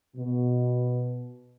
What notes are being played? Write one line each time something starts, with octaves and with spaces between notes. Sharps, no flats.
B2